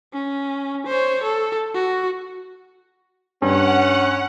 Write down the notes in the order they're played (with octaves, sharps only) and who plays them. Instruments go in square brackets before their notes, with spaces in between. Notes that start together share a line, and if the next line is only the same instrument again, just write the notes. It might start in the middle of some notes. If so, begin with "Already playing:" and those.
[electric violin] C#4
C5 C#5
A4
F#4
[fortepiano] G2 [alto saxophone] C#4 [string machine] F#5